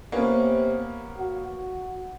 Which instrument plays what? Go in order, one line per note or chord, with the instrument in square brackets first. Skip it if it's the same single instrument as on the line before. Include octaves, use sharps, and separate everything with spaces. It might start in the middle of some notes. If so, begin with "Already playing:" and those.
[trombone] C3 [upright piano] A#3 B3 C#4
[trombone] F#4